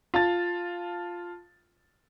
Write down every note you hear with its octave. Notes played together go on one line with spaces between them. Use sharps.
F4 A5 A6